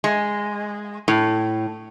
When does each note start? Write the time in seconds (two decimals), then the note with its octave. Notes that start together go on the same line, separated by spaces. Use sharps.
0.04 G#3
1.08 A2